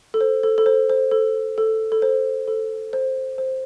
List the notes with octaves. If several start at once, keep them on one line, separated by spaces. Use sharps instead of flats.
A4
C5
A4
A4
C5
C5
A4
A4
A4
C5
A4
C5
C5